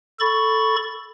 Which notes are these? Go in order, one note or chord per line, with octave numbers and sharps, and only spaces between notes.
A4 B5 C#6 A6